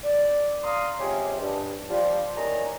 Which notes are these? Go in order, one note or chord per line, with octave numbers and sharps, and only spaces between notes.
D5
D5 F5 A#5 C6 D#6
C3 F3 G#3 C#4 G4 G#4
G2
F3 G3
A2 D#3 G3 D5 G#5 A#5